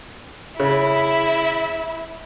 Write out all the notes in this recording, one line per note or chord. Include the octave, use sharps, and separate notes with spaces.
C#3 E4